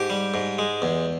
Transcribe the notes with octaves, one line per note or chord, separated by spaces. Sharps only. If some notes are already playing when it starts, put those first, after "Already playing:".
Already playing: G#2 G4
G3
G#2
G#3
E2